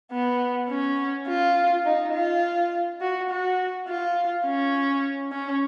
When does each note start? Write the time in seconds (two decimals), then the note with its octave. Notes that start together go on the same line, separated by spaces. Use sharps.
0.12 B3
0.70 C#4
1.28 F4
1.85 D#4
2.14 F4
3.01 F#4
3.30 F#4
3.88 F4
4.46 C#4
5.32 C#4